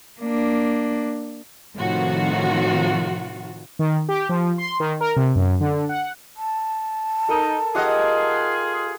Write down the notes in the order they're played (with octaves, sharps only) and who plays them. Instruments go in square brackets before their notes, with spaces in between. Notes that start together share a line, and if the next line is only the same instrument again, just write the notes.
[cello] A#3 D4
[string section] A2 C3 D#3 F3 F4 F#4
[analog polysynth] D#3
G4
F3
C6
D#3
A#4
C3
F#2
D3
F#5
[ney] A5
[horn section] D#4 [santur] A4 A#4
[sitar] D#4 D#5 [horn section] F4 G#4 [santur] G4 F#5